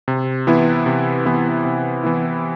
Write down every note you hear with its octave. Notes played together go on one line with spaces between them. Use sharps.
C3
E3 B3 E4
C3
E3 B3 E4
C3
E3 B3 E4